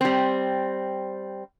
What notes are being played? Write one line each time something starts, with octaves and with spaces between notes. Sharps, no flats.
G3 C4